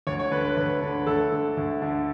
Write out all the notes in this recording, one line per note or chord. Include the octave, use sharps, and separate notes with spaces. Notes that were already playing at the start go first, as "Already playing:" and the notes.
D2 C#5
C#5
D3 B4
B4
D2 B4
D3
D2 A4
D3
D2
D3